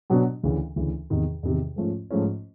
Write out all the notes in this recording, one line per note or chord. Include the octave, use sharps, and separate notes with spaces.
B2 F#3 B3 D4 F#4
D2 C#3 E3
D2 C#3 E3
E2 C3 D#3
E2 C3 D#3
G#2 F3 A3 C#4 F4
G#2 F3 A3 C#4 F4